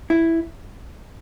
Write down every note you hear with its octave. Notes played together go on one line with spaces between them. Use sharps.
E4